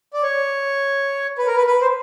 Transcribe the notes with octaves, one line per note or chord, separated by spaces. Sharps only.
D5
C#5
B4
A#4
B4
B4
C5